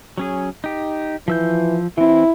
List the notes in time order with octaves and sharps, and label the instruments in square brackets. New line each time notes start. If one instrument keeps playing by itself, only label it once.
[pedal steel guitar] F#3 C#4 G#4
D#4 G4
[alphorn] E3 [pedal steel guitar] F3 E6 G6
[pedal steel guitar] E3 C4 [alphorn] E4